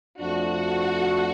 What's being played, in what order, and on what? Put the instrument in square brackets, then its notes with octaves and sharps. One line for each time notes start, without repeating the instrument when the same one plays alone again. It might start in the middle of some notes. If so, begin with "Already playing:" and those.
[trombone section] F2 F3 A3 D4 [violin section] F#4